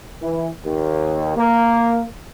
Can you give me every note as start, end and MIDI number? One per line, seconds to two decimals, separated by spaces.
0.22 0.48 52
0.64 1.33 39
1.36 2.01 58